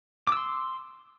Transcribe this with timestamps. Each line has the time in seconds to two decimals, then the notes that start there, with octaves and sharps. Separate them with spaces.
0.27 D6
0.32 E6
0.37 C6